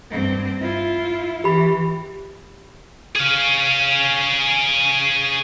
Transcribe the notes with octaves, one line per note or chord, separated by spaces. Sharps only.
G2 C4
E4 F4
E3 G4 B5
G#4 F5